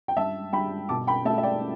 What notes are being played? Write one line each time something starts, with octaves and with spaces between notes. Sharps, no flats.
G5
G2 E5 A5
G2 G5 B5
B2 A5 D6
G5 B5
A3 E5 A5
E5
D5 G5